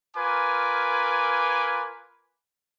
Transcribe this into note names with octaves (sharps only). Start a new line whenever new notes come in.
F4 A#4 B4 G#5 D6